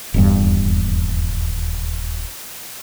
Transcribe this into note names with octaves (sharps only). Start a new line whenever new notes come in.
D#1 E2 G2